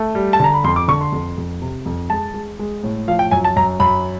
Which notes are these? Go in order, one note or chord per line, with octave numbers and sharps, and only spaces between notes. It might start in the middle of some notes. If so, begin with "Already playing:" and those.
Already playing: A3
G3
A5
D3 A#5
B5
F2 C6
D6
D3 C#6
C6
F2
F2
C3
F2
G#3 A5
G#3
G#3
A2
F3 F5
G5
F#2 G#5
A5
F#2 A#5
F#2 B5